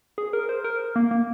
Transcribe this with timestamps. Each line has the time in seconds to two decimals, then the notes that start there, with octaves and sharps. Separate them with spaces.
0.18 G#4
0.33 A#4
0.49 C5
0.64 A#4
0.96 A#3
1.11 A#3